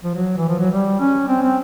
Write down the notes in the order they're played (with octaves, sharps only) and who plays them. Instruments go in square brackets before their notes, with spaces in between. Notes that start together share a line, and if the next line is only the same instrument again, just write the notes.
[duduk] F3
F#3
E3
F3
F#3
G3
C#4
C4
C4